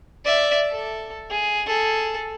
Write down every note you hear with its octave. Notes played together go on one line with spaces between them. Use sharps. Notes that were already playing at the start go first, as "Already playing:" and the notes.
D5 E5
A4
G#4
G#4 A4